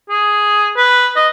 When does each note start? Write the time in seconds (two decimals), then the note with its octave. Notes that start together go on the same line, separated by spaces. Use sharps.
0.10 G#4
0.77 B4
1.16 D#5